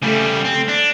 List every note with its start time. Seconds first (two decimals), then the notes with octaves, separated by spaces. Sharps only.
0.02 C#3 G3 A3
0.44 C4
0.68 D4